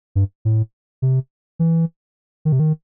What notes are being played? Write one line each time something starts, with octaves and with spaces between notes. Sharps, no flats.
G2
A2
C3
E3
D#3
C3
D#3